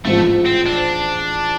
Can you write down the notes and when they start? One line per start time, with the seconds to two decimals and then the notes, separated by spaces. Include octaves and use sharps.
0.05 A1 G#2 F3 A3
0.46 C4
0.66 D4